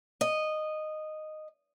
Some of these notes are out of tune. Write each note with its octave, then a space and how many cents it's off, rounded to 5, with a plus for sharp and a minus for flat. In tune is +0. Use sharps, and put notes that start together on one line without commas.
D#5 -10